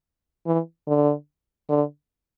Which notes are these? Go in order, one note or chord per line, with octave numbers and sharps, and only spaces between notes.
E3
D3
D3